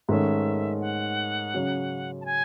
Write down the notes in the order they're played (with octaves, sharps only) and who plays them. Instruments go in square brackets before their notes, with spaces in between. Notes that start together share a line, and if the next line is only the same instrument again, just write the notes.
[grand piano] G#2 D#3 A3 C#4 [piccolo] E5
[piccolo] F#5
[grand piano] C#3 F#3 C#4
[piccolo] A5
G#5